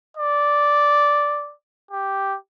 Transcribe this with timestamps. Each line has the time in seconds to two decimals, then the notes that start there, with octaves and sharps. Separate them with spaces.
0.17 D5
1.91 G4